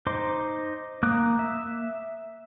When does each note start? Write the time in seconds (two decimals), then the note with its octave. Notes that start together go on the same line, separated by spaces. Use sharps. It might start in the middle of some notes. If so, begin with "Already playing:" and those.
0.07 D#4 C5 C6 D6
1.03 A#3 D6 D#6 F#6
1.39 E5